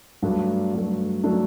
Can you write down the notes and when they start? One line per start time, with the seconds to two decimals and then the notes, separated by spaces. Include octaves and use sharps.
0.22 G2 F#3 A3 D4
0.74 G2 F#3 A3
1.24 F#3 A3 D4